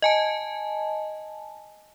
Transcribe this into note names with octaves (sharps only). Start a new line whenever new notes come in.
D#5 G#5 A5